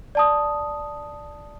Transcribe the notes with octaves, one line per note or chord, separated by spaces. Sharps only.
D5 A5 D#6